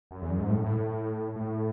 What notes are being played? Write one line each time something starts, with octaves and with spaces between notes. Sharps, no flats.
F#2
E2
F#2
G#2
A2
A2
A2